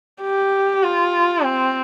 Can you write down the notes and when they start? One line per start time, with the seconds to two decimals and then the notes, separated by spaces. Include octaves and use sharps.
0.22 G4
0.83 F4
1.44 C4